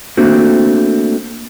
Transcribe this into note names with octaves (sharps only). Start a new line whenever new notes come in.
A3 A#3 C4 D4 F#4